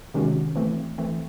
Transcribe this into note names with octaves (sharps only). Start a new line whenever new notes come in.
C3 D#3 G#3 C#4 F#4
E3 A3 C4
E3 A3 C4